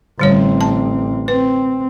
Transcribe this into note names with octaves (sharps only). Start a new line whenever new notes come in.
A1 D3 G3 C4 C#5
A5
C4 B4